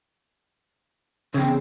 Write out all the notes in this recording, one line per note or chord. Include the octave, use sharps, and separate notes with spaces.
E2 C#3 C4